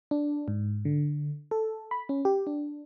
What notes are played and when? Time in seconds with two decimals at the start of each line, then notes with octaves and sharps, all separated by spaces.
0.11 D4
0.48 G#2
0.85 D3
1.51 A4
1.91 B5
2.09 C#4
2.25 G4
2.47 D4